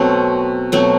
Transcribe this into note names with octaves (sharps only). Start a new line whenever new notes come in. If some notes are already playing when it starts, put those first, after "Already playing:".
Already playing: B2 F#3 A3 C4
B2 F#3 A3 C4